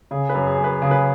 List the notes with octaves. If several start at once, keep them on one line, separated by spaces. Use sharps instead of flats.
C#3 G#4
B4
F#2
G#4
F#2
B4
C#3 G#4
B4